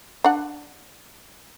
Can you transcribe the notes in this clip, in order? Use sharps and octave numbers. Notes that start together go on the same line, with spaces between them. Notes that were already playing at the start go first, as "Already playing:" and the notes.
D4 F#5